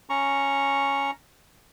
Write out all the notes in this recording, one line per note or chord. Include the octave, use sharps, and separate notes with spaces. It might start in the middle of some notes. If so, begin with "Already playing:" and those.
C#4 A#5 C#6